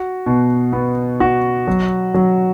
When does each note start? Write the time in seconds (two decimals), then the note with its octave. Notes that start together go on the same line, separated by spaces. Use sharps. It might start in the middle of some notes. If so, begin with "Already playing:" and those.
Already playing: F#4
0.26 B2
0.73 B3
1.20 F#4
1.67 F#3
2.14 F#3